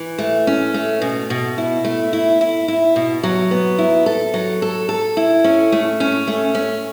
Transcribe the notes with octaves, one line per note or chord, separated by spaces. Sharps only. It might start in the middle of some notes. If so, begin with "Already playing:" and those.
Already playing: E3
A3
C#4
A3
B2
B2
E4
A3
E4
E4
E4
B2
F#3
B3
E4
A4
F#3
A4
A4
E4
C#4
A3
C#4
A3
C#4